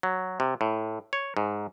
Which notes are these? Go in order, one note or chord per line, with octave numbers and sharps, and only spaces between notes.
F#3
C3
A2
C#5
G#2